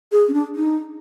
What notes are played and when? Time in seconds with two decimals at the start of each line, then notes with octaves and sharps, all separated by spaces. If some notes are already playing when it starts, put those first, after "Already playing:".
0.12 G#4
0.28 C#4
0.34 D4
0.56 D#4